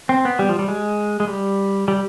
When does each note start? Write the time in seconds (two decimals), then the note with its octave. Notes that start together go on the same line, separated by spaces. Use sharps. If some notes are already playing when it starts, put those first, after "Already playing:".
0.09 C4
0.25 B3
0.39 G3
0.49 F3
0.59 G3
0.68 G#3
1.20 G#3
1.27 G3
1.88 G3